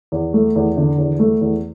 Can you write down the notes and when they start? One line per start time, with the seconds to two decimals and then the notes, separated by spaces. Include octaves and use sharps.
0.12 E2
0.34 A3
0.56 E2
0.77 D3
0.98 E2
1.19 A3
1.41 E2